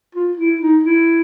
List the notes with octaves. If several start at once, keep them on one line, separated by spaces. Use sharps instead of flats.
F4
E4
D#4
E4